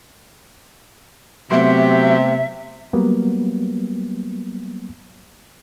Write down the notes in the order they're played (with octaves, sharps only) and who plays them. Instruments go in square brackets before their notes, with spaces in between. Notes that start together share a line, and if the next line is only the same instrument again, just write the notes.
[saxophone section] C3 [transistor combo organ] F#3 G4 [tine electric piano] A3 B3 C6 [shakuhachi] E5
[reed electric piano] F#3 G3 A#3 B3